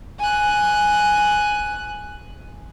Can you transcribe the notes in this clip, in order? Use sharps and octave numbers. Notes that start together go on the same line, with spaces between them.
G#5 F#6